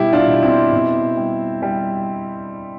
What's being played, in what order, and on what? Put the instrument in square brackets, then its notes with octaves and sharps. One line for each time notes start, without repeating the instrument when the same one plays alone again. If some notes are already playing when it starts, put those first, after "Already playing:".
Already playing: [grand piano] B2 G3 E4 G4
D4 F4
B2
C4 E4
B2
G3
G3